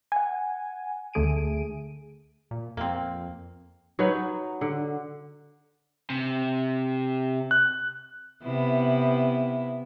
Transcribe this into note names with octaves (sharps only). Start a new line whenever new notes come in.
F#5 G#5
D2 D3 A3 G#4 D7 D#7
A#2
F2 A#3 C4
F#3 D#4 F#4 B4
D3
C3
F#6
C3 B3 E4